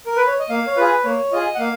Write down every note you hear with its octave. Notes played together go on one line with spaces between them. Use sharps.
A#4
B4
C#5
D#5
A#3 F5
C#5
F4 G#4 B4
A#3 C#5
F4 G#4 D#5
F#5
A#3 F5